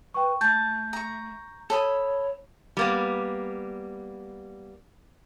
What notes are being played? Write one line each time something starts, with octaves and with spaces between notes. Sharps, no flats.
B4 G5 C#6
A3 A5 G6
A#5 C#6
A4 C#5 B5 D#6
G3 A#3 B3